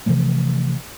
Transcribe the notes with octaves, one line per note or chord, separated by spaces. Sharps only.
C3 E3 F3 A3